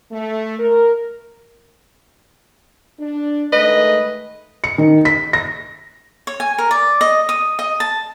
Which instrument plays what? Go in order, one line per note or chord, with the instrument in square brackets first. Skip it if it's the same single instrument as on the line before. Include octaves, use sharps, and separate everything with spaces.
[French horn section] A3
A#4
D4
[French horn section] D#3 G#3 A3 [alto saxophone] B4 [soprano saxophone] D#5
[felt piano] C#7
D#3
B6
A#6
[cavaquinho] C#5
G#5
A#4
D5
D#5
D#6
D#5
A5